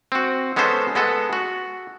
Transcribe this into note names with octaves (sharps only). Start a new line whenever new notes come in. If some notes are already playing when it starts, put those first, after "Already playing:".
C4 F#4
G#3 B3 C#4 A4 C5
G#3 B3 A4
F#4